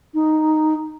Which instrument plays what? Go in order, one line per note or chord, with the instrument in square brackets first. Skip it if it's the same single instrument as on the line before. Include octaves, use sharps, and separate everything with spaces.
[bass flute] D#4